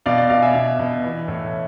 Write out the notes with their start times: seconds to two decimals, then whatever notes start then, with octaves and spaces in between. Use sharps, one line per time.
0.06 B2 D5 F5
0.18 D5
0.30 B2 D5 F5
0.42 E5 G#5
0.55 B2
0.79 B2
1.04 E3
1.28 A2